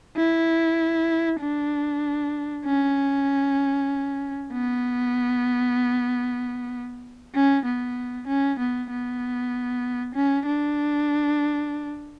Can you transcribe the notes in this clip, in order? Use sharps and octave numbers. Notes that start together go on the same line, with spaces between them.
E4
D4
C#4
B3
C#4
B3
C#4
B3
B3
C#4
D4